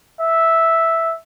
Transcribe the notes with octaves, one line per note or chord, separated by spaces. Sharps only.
E5